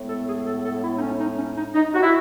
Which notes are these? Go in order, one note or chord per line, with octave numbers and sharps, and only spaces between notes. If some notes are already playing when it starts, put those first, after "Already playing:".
Already playing: A2 G#3 B3
A4
G#4
A4
A4
E4
D#4
C#4
D#4
C#4
D#4
D#4
F#4
E4